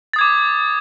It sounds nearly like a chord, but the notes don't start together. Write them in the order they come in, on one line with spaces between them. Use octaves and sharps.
A6 D#6 G#6 D6